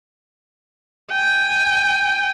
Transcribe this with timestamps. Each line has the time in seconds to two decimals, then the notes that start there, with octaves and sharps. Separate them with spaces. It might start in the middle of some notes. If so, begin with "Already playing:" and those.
1.11 G5 G#5